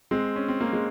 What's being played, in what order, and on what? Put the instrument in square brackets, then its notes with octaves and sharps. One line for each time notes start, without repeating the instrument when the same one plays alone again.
[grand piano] G#3 C4
C#4
C4
A#3
G#3